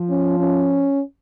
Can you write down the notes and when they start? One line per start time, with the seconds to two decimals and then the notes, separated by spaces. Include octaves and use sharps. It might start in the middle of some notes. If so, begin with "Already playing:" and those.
Already playing: F3
0.10 C#4
0.39 C#4